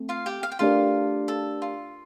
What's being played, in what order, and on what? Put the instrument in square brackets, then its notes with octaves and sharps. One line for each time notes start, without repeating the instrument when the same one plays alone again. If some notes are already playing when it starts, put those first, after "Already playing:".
Already playing: [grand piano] A3 C4
[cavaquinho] F4 F5
G4 G5
F5
G5
[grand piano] A3 D4 G4 A#4 D5 [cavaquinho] F4 F5
[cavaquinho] A4
F4